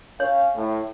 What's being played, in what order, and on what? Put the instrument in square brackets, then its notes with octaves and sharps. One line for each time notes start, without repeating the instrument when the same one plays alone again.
[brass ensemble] C#4 F5 [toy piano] C#5
[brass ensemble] A2